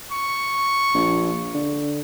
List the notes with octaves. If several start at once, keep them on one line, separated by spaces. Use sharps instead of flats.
C#6
A#1
D3